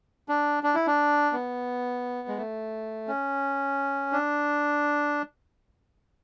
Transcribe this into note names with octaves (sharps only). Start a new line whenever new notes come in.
D4
D4
E4
D4
B3
G#3
A3
C#4
D4